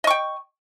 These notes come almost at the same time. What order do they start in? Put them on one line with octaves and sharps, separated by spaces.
D#5 C#6 G5